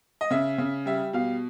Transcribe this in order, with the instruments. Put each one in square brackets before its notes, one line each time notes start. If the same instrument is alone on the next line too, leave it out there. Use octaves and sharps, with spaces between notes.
[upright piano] D#5
C#3 E5
C#3
G3 E5
B2 F5